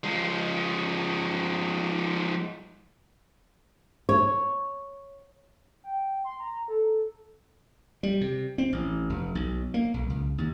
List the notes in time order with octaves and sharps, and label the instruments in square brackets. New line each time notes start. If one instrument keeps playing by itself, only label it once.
[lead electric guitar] F3 G#3
[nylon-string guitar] C#5
[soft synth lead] G5
C6
A#5
A4
[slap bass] G3
C3
C4
A1
F1
B1
A#3
B1
C#2
D#2